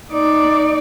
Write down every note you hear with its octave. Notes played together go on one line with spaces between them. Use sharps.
D#4 D5